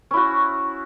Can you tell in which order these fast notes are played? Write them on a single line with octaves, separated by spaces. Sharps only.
C#4 E4 F#4